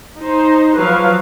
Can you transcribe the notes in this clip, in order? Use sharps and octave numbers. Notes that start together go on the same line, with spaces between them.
D#4 C5
F3 F#3 B4 C#5 F5